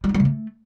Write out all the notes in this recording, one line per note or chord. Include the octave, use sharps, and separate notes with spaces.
G3
D#4
G3
C#3
A3